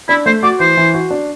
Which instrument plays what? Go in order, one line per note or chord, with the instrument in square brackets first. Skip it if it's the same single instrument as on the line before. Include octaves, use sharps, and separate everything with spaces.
[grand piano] D4 [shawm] E4
[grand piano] A3 [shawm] C5
[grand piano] F#4 [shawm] D5
[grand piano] E3 [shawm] C5
[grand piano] E3
F#4
D4